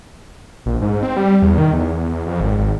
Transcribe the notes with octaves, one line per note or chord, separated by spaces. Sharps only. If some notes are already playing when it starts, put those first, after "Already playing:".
A#1
G#2
C4
G3
E2
D#3
E2
F2
G#1
G#1